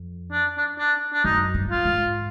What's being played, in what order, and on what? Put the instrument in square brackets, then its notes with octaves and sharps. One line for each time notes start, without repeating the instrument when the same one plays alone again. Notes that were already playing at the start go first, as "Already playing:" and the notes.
Already playing: [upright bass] F2
[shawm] D4
D4
D4
D4
[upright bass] F#2 [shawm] D#4
[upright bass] G2
[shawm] F4
[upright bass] G#2